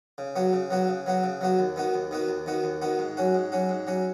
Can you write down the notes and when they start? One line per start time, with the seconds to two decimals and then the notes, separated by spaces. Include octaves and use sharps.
0.18 C#3
0.36 F#3 B3 F#4
0.53 C#3
0.71 F#3 B3 F#4
0.88 C#3
1.06 F#3 B3 F#4
1.24 C#3
1.41 F#3 B3 F#4
1.59 D#2
1.76 D#3 B3 F#4
1.94 D#2
2.11 D#3 B3 F#4
2.28 D#2
2.46 D#3 B3 F#4
2.64 D#2
2.82 D#3 B3 F#4
2.99 G#2
3.17 F#3 C#4 F#4
3.35 G#2
3.52 F#3 C#4 F#4
3.69 G#2
3.87 F#3 C#4 F#4